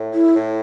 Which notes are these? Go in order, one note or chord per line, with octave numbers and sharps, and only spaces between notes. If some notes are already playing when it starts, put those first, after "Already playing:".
Already playing: A2
E4
A2